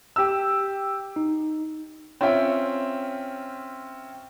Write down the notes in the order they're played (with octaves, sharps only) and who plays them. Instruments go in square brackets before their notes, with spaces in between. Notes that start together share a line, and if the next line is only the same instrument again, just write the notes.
[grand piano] G4 E6
[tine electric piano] D#4
[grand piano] C4 C#4 F4 E5 G5